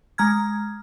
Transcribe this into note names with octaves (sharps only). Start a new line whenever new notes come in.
G#3 A#5 F6 G#6